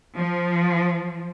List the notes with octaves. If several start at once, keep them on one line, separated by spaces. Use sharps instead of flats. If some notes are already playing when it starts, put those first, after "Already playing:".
F3